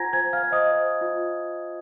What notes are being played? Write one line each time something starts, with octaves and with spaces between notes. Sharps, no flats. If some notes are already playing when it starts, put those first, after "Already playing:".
Already playing: F4 C5 F#5 G#5 A#5 G#6 A#6
C5 G#5 G#6
F5 F6
C5
D#5 D#6
C5
F4